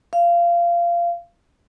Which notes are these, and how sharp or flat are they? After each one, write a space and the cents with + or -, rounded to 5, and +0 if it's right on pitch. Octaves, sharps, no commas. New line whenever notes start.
F5 -20